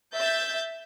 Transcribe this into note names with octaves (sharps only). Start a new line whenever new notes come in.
E5 G6 A6